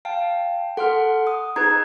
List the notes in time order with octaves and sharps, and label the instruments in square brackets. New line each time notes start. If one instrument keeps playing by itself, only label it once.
[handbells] F5 G5 A5
[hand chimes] A4 [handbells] F#5 C6 F6
[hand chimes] D#6
[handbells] D#4 G#4 B4 [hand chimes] A#5 G#6